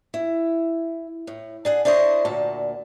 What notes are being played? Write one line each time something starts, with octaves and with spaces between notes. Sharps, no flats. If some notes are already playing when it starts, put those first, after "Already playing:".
E4
A2
D4 G#4 F#5
D4 E4 C5 C#5 D#5
D2 A#2 A5